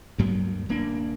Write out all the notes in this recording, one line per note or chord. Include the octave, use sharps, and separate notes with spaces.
D2 G2 F#3 A#3
D#1 A#3 D4